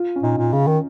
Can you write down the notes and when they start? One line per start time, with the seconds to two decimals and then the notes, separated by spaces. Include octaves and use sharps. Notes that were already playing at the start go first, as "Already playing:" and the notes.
Already playing: F4
0.16 C#4
0.23 A#2 D#4
0.38 A#2
0.52 C#3 C#4
0.68 D#3